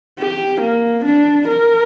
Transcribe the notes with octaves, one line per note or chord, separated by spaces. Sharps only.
G4
A#3
D4
A#4